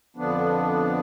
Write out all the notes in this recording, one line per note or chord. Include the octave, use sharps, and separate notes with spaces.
F2 D3 F3 B3 D4